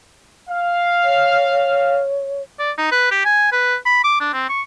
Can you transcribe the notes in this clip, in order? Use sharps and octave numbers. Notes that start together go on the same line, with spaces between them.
F5
C#5
D5
D#4
B4
G4
G#5
B4
B5
D6
D4
C4
C#6